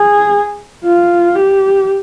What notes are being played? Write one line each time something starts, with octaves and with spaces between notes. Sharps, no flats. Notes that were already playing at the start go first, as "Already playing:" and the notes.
Already playing: G#4
F4
G4